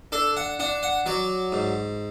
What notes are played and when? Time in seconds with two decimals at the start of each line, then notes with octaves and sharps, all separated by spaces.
0.12 D4 A4
0.37 F#5
0.60 D4 F#5
0.83 F#5
1.06 F#3 D5
1.52 G#2